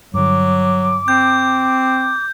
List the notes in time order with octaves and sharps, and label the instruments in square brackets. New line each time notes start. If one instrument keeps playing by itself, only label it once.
[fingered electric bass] G2 D3 [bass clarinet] F#3 [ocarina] D6
[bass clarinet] C4 [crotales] G6